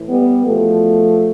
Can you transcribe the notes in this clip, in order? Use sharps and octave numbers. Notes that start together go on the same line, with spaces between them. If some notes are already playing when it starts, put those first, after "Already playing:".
Already playing: A2 E3
G3 B3
E2 B2 F3 A3